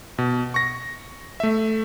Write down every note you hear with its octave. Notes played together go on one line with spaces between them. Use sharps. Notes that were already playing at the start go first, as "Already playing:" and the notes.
B2
C#6 A#6
A3 E5